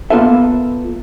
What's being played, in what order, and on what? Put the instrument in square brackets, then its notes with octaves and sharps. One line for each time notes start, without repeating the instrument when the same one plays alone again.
[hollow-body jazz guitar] A#3 B3 F4 A4 B4 E5